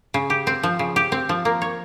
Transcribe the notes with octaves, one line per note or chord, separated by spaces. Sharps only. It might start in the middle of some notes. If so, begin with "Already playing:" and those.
C#3
G4
C4
F3
C#3
G4
C4
F3
A#3
C#5